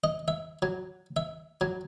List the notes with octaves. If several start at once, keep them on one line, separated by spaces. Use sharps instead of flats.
D#5
E5
F#3
E5
F#3